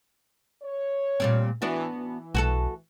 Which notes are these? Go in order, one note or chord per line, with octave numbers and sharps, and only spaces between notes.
C#5
A#2 G3 C4
E3 B3 D4 F#4
E3
B1 F#4 G#4 A4